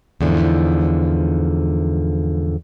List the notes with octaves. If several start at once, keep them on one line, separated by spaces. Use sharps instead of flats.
E2 G#2 D3 F3